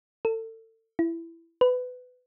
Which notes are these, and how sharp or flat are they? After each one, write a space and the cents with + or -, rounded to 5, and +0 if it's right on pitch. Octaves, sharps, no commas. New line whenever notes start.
A4 +30
E4 +15
B4 +20